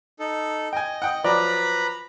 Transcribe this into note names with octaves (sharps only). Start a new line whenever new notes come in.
D#4 A4
D#5 G5 G#5
F#5 G5 D#6
F3 F#3 B4 D5 A#5 B5